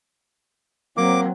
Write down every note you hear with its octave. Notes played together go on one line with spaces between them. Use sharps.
F#3 A#3 C4 D6